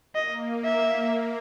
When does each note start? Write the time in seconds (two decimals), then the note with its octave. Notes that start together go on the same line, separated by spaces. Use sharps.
0.15 A#3 D#5
0.64 E5